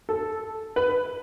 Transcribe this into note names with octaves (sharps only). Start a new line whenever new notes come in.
A4
B4